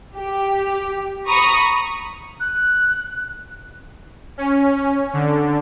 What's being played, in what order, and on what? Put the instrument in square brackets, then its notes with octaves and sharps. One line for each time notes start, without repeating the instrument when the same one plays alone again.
[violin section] G4
A#5 B5 C#6 D#6
[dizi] F#6
[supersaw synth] C#4
D3